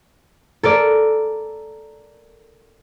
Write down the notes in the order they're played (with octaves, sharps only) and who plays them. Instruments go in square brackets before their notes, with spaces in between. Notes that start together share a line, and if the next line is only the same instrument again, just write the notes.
[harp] A4 A#4 D5